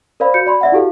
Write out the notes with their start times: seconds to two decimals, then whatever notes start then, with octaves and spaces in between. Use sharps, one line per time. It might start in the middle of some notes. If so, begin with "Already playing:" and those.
0.20 A#4 C5 D5 F5 B5
0.34 F#4 G6 C#7
0.46 D5 B5 C6
0.61 D5 E5 F#5
0.72 E4 F#4 G4 A4 F5